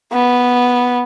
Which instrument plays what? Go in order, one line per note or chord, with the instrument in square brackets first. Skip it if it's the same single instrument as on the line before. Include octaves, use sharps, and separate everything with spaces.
[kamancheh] B3